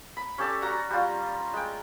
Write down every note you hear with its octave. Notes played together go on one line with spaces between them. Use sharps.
B5
C#4 G4 A4 D5
F#4 A#5
G3 F4
G#3 G5